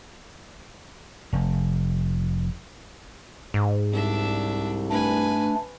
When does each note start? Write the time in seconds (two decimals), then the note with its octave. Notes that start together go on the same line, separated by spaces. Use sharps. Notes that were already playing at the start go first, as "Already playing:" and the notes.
1.33 F1
3.54 G#2
3.93 C2 D4 E5
4.90 A3 D4 B4 G#5